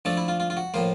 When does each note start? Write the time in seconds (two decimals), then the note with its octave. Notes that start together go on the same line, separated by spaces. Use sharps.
0.05 F3 A3 D4 A4
0.17 E4
0.28 F4
0.40 F4
0.50 F4
0.57 F#4
0.74 A2 F3 A#3 C5